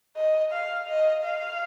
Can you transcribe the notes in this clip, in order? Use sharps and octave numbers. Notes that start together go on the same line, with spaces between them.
D#5
F5
D#5
F5